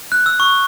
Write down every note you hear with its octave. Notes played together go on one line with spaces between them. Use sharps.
F#6
E6
C#6